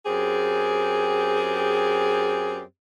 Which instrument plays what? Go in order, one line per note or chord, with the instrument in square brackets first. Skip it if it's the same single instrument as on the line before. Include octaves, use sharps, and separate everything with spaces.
[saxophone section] F#2 C4 G4 G#4